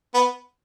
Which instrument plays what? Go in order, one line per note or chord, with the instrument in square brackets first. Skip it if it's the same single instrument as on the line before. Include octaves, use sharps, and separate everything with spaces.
[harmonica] B3